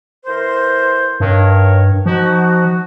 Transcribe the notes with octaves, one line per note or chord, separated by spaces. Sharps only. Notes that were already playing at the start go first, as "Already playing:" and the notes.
E3 A#4 C5
G2 D#3 A#4 C#5
F3 D#4 F#4